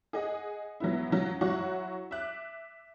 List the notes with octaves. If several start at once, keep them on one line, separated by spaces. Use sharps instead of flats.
G#4 D#5 F#5
F#3 B3 E4
C#3 F3 F#3
F#3 E4 F#4 C#5 F#5 C#6
E5 D6 F#6